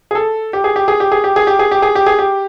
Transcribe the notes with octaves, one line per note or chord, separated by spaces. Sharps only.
G#4
A4
G4
G#4
G4
G#4
G4
G#4
G4
G#4
G4
G#4
G4
G#4
G4
G#4
G4